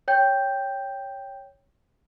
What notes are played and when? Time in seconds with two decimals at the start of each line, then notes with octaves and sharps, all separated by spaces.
0.08 C#5 G5 G6